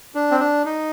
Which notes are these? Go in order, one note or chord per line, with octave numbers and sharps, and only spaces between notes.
D4
C4
D4
D#4